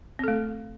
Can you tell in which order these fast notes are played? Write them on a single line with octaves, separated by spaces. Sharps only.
C4 A4 A3